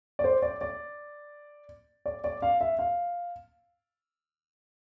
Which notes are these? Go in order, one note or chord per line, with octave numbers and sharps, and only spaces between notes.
D5
C5
D5
D5
D5
D5
F5
E5
F5